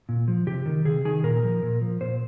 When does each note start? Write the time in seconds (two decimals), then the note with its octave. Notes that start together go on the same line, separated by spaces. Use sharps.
0.09 A#2
0.28 F3
0.47 C3 G4
0.66 D#3
0.85 C3 G#4
1.05 D#3 G#4
1.24 A#2 A#4
1.43 F3
1.62 A#2
1.81 F3
2.01 A#2 C5